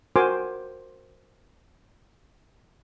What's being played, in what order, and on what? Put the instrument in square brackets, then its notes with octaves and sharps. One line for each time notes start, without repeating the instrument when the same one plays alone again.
[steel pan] F#4 A#4 C5 G#5 C6 D6